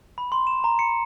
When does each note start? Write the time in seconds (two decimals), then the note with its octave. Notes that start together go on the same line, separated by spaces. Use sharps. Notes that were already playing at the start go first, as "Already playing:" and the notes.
0.18 B5
0.32 C6
0.47 E7
0.64 A#5
0.79 C#7